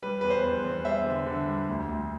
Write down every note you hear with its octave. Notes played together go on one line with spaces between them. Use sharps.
G3 B4
E2 B4
C5
E2
E2
G3 C5 E5
D3
D3
G3
D2
D2